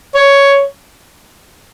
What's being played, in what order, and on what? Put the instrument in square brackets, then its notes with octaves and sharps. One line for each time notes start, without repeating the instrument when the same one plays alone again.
[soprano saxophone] C#5